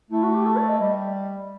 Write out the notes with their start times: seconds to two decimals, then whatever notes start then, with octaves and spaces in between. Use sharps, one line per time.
0.10 A3 E4
0.22 F#4
0.34 G4
0.45 A4
0.56 D5
0.68 D#5
0.79 G3 D#5